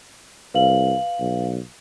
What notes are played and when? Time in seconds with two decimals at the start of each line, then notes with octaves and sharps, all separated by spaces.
0.54 C2 B4 F5 F#7
1.20 B1